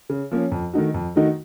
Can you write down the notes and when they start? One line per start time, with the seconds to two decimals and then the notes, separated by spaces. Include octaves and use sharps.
0.09 C#3
0.31 F3 A#3 C#4
0.52 F2
0.73 D#3 A3 D#4 F#4
0.94 F2
1.16 D#3 A3 D#4 F#4